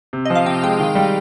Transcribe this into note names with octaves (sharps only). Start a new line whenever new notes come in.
C3
F3 D#5
F5
C3 G5
G#3 G5
D#3
G3